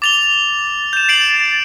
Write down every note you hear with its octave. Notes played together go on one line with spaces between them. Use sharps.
D6 A6 F7 G7
G6 E7
C7 D7 F#7